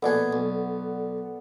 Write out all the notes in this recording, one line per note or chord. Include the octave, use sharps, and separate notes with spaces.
A#1 B2 B3 G#4 A4 D5 F#5
B1